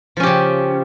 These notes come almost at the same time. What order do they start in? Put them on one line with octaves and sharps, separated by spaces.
F3 C#4 G4 C#3